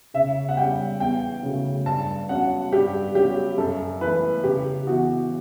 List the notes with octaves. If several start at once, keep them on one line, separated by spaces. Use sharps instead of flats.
C#3 E5
F#5
G3 C#4 G5
E2 G5
C#3 F#3 A3
G2 A5
F#3 C#4 F#5
G2 G4
F#3 C#4 G4
F#2 A4
E3 A3 B4
C#3 G4
E3 B3 F#4